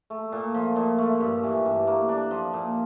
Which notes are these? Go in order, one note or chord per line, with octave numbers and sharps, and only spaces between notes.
A3
A#2
F3
A#2
A3
G2
E3
G2
A#3
D4
F3
A#2